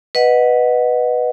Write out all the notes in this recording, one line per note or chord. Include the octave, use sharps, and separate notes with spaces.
B4 D#5 F#5